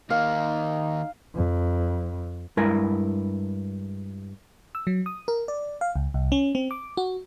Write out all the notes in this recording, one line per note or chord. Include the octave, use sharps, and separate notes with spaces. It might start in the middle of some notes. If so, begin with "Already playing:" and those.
D#3 A#3 D#4 F5
F2
G2 G#3 E4 A#4 G#5
E6
F#3
D#6
A#4
D5
F5
C#2
C2
C#4
C4
D6
F#4